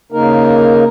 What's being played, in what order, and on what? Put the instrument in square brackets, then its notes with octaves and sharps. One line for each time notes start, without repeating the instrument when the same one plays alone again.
[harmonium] C#3 A#3 D#4 A#4